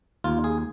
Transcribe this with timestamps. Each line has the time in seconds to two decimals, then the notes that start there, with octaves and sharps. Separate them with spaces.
0.24 D#2 F4
0.44 G#4